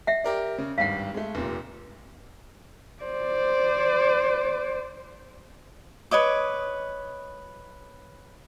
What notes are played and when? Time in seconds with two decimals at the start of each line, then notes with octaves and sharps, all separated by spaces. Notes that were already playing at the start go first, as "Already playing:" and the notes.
0.07 E5 F#5
0.24 G4 A#4 D5
0.58 C#3
0.78 G#1 G2 F5 F#5
1.15 G#3 A3
1.35 F1 A#2
3.03 C5 D5
6.11 B4 C#5 D#5 D6